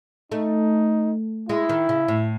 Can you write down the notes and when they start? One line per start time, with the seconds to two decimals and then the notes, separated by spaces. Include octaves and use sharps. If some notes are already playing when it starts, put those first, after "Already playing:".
0.32 A3 D#4
1.49 G#3 E4
1.69 D#3
1.89 C#3
2.08 A2